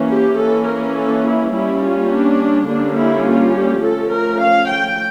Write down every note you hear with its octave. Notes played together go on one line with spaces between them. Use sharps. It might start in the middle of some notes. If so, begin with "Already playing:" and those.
Already playing: E3 A#3 C#4
G4
E3 A#3 C#4 A4
A#4
A4
E4
G3 A#3 C#4 E4
F4
D4
D3 G3 A#3 C#4 D4
E4
F4
G4
F3 A3 C#4 A4
A#4
F5
G5